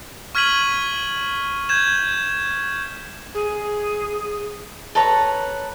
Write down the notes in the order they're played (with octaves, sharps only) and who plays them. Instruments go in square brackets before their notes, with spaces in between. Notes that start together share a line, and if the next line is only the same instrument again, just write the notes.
[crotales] C#6 F6 G#6 B6 D#7 F#7
G6 G#6 E7
[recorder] G#4
[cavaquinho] A4 B4 C#5 A#5